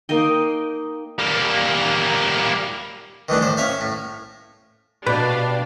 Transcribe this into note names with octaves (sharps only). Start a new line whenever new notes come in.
A#3 D#4 D#5 G5
G3 A#3
D#3 E3 A3 D4
A2 C5
C#4 E5 F5
A2
B2 D4 G4 B4 D5 F5